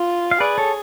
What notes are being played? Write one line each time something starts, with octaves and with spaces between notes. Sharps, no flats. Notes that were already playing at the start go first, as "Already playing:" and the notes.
Already playing: F4
F5
G#4 B4 D5
A4 C#5